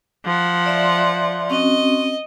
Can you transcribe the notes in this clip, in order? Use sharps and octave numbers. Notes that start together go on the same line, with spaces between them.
F3 F#5
D5 E5 C6
C4 C#4 F#4 D#5